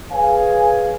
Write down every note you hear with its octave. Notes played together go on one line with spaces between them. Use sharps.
G#4 B4 C#5 F5 G#5